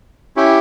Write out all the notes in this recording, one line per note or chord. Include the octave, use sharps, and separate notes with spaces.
C#4 E4 G4